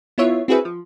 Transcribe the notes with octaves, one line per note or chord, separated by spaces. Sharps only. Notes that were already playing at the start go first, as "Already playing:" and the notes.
B3 E4 F4 C#5 E5
C4 E4 F#4 G#4 B4 E5
F3